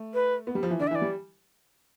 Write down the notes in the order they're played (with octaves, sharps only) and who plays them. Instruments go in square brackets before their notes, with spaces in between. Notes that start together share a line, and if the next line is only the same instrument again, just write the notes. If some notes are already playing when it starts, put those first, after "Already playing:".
Already playing: [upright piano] A3
[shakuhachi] B4
[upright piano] B3
G3
F3
E3
[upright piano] D3 [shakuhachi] D5
[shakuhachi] E5
[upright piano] E3 [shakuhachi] D5
[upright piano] G3